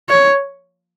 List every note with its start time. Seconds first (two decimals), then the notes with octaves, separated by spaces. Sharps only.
0.09 C#5